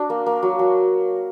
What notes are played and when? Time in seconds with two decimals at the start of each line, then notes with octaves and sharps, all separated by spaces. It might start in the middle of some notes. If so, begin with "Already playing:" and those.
Already playing: D4 F#4
0.10 A#3
0.26 A#3
0.43 F#3
0.59 F#3